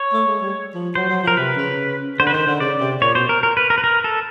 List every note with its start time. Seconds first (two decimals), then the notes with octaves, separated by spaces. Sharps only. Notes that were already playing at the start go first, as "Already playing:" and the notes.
Already playing: C#5
0.13 A3
0.28 G#3
0.42 G3
0.75 F3
0.95 F#3 C5
1.09 F#3
1.23 F3 A#4
1.37 C3 B4
1.57 C#3
2.19 D3 C5
2.27 B4
2.33 D#3 C5
2.47 D3
2.60 C#3 D5
2.81 C3
3.02 A#2 C#5
3.15 B2 C5
3.29 A#4
3.43 A#4
3.57 B4
3.70 A#4
3.78 B4
3.84 A#4
4.04 A4